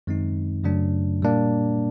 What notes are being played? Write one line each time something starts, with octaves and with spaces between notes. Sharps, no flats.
F#2 D#3 G#3 C4 D#4
F#2 C#3 F#3 A3 D4
A#2 G3 A#3 D4